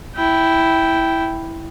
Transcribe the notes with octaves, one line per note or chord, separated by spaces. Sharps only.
E4 G5